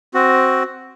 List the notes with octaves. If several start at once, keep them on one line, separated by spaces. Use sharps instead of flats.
C4 F#4